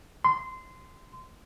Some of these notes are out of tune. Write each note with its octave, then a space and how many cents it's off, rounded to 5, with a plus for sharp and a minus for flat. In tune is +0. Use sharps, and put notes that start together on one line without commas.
C6 -20